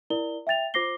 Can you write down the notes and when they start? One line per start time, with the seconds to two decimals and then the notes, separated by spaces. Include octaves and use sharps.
0.10 E4 A#4 D5 G7
0.47 E5 G5 A6 F7
0.74 F4 C5 D6 A#6 C7 G7